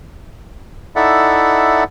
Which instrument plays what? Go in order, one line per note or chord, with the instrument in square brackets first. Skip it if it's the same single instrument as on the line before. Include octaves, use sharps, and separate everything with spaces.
[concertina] D#4 E4 A4 D5 E5 F#5